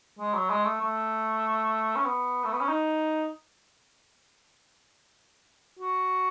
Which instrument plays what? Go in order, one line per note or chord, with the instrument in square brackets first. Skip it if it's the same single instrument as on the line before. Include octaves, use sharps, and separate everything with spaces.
[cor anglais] G#3
F#3
G#3
A3
A3
C#4
B3
A3
B3
C#4
D#4
F#4